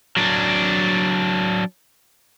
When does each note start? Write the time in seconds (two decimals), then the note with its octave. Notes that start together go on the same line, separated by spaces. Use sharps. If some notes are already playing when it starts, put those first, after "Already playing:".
0.17 F#3 D4